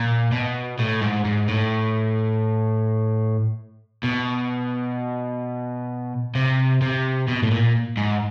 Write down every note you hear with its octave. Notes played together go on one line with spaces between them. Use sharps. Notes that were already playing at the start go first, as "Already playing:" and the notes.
Already playing: A#2
B2
A2
G#2
G#2
A2
B2
C3
C3
B2
A2
A#2
G#2